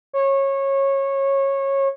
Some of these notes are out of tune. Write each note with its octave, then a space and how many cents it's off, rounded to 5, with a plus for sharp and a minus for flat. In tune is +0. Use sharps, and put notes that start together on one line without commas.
C#5 -20